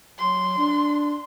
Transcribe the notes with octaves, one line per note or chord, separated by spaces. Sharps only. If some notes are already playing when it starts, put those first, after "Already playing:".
F#3 C6
D4